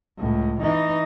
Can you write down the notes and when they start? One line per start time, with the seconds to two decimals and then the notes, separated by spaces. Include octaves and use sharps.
0.18 C#2 A2
0.60 E3 D#4